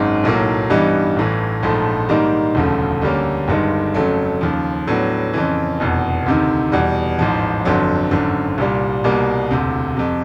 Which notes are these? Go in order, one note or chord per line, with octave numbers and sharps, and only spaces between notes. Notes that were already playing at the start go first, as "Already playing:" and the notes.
Already playing: G#1 F#2 D#3 G#3
B1 A2 F#3 A#3
G2 E3 G3 B3 D#4
A1 A2 E3
A#1 G#2 F3 A3
G#2 D#3 G3 A#3 D#4
E1 D2 C#3 F3 A3
D2 D3 G3 A#3 C#4
G1 G2 D#3 G#3
F2 C#3 F#3 A3
D#2 C#3 F3
A2 F#3 B3 D4
F2 C#3 E3
F1 E2 B2
D2 C3 D#3
E2 B2 G3
A1 G#2 F3
G1 F2 D3 F#3
G#1 F#2 D3
C2 A#2 G3
C2 B2 G3 A#3
E1 D2 C3
F2 C3